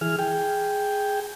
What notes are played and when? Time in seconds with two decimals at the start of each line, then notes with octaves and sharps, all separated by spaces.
0.01 E3 G#4 F6
0.19 G#4 G5